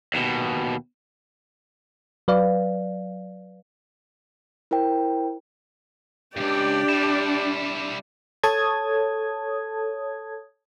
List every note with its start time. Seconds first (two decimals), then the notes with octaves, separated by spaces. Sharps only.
0.14 D#2 B2
2.28 F#3 B4 D5 F5
4.71 E4 A#4 C5 G5
6.37 C#2 G2 D4 G4 D5
6.89 G3 E4
8.43 A4 C#5 A5 D#6 G#6